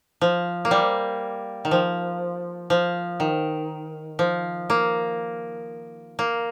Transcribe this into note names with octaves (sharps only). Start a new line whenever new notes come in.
F3
A#3
G3
D#3
F3
F3
D#3
F3
A#3
A#3